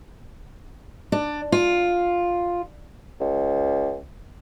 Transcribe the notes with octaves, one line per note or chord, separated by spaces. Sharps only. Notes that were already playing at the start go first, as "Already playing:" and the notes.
D4
F4
C#2